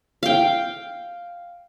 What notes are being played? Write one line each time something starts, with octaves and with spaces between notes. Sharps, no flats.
F5 G5